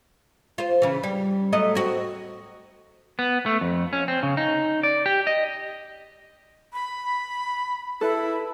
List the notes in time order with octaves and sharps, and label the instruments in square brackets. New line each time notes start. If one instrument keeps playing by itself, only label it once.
[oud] F4 C5
C#3 E3
G3
F#3 A3 D#5
C4 F#4
[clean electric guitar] B3
A3
F2
C#4
C4
C#3
D#4
D5
G4
D#5
[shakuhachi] B5
[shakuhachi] E4 [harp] A4 B4